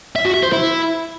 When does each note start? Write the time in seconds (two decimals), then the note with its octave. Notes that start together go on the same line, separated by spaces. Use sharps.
0.16 E5
0.25 F#4
0.34 E5
0.43 C5
0.52 E4